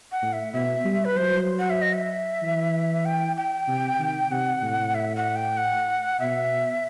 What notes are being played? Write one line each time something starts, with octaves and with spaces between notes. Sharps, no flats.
F#5
A2
E5
B2 E5
G3
B4
F#3 C5
F#5
E5
D#5
E5
E3
G5
G5
C3
D#3
C3 F#5
A2
E5
F#5
G5
F#5
B2 E5